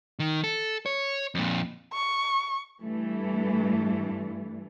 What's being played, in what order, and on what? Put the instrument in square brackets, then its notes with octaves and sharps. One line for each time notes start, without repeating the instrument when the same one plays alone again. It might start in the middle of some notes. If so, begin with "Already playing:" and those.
[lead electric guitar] D#3
A4
C#5
F2 A#2
[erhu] C#6
[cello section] G2 E3 A3